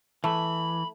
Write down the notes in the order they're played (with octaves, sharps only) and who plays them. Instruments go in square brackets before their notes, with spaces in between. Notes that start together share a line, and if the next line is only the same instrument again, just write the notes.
[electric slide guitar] E3 [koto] A3 [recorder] B5